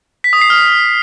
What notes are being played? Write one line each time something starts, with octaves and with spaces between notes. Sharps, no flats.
B6
D#6
C7
F6